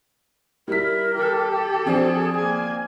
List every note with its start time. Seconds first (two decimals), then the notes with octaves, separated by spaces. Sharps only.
0.68 G3 E4 A#4 B6
1.16 G4 A4
1.86 F3 C4 D4 G#4
2.37 A#3 G#5